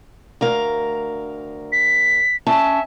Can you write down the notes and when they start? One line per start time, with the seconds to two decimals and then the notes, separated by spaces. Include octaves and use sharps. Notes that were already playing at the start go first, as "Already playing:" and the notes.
0.41 D2 A#4 F5
1.72 B6
2.47 C#4 E5 A5